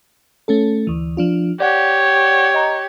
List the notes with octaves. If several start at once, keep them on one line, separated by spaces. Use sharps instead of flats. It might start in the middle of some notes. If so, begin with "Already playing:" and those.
A3 C#4 A4
D2 E3
F3 D4 F4
G4 C#5 D5 F#5
D#5 A#5